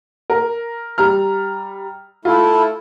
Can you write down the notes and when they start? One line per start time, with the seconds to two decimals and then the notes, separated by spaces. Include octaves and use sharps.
0.30 A#4
0.98 G3 A#5 F6
2.25 A3 E4 F4